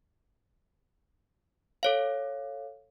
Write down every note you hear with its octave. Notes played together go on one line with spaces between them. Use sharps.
A4 C#5 F5